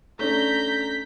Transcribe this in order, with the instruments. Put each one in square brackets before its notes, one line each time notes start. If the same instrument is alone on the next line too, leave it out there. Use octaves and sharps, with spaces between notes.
[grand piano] A3 C#4 D4 [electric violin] A#5 G6 [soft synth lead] B6